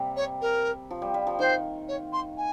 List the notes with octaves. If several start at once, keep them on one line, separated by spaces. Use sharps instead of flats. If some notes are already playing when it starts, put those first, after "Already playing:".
Already playing: C3 G3 A#3
C#5
A#4
F3
G3
G3
F3
D#3 C5
C#5
C6
G#5